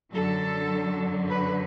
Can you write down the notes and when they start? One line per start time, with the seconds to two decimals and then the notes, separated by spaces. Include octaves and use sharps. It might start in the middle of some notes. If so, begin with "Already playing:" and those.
0.12 F#2 D3 F#3 A4
1.28 B4